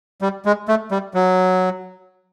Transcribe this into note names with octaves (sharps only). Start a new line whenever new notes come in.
G3
G#3
A3
G3
F#3